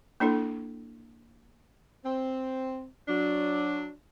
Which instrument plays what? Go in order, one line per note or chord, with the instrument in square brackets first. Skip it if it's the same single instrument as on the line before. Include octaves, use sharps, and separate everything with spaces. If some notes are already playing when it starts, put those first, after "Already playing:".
[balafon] A#3 D4 E4 A4
[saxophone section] C4
F#3 D4